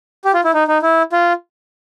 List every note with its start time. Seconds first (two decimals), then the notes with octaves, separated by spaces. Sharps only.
0.25 G4
0.34 F4
0.44 E4
0.54 D#4
0.68 D#4
0.82 E4
1.12 F4